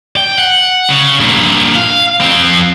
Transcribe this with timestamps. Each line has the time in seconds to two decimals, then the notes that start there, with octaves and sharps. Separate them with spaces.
0.17 G5
0.39 F#5
0.90 C#3
1.20 G2 A#2
1.75 F5
2.21 F2 C4